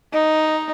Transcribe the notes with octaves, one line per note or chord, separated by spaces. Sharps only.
D#4